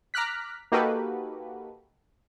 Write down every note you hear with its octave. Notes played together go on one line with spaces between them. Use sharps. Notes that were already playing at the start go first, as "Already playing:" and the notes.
A#5 D6 F6 F#6 B6
A#3 D#4 F#4 G4 A4 B4